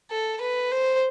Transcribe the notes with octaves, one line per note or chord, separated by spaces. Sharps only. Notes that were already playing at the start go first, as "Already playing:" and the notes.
A4
B4
C5